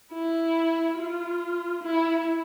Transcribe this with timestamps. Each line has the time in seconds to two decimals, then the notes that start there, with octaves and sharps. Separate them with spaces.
0.13 E4
0.98 F4
1.84 E4